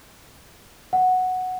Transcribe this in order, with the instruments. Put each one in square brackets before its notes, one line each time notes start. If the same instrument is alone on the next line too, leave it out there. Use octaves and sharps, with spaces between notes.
[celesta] F#5